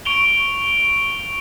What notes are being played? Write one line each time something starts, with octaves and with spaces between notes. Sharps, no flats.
C#6 D7 F7 G7